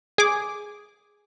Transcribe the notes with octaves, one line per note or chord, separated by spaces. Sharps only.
G#4 D6